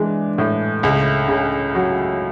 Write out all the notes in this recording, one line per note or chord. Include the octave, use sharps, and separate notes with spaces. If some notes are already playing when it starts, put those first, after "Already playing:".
Already playing: E3 G#3 D4
A2
C#2
C#3
F#3